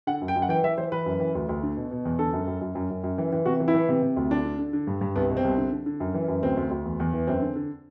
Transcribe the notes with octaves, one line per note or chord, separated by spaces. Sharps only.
D3 F#5
F#2
G5
F#2
F#5
E3 G5
E3 E5
E3 C5
E3 B4
F#2
E3
D2
D2
D3
B2
B2
E2
D3 A4
F#2
F#2
F#2
F#2
F#2
F#2
E3
E3
C3 F#4
E3
E4
E3
C3
C3
D2
D3 D4
D3
D3
D3
G2
G2
C2 B3
B2
C4
C2
D3
D3
D3
F#2
E3
F#2
D2 C4
D2
D2
E2
E2
E3
F#2 C4
D3
D3